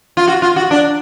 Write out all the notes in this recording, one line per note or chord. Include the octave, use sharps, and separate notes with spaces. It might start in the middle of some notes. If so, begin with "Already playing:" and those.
F4
F#4
F4
F#4
D4